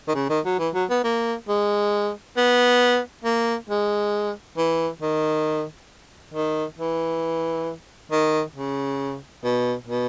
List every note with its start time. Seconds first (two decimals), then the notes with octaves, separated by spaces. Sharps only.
0.08 D#3
0.15 C#3
0.29 D#3
0.45 F#3
0.59 E3
0.74 F#3
0.90 B3
1.04 A#3
1.48 G#3
2.37 B3
3.24 A#3
3.70 G#3
4.57 E3
5.02 D#3
6.34 D#3
6.79 E3
8.11 D#3
8.56 C#3
9.44 B2
9.87 B2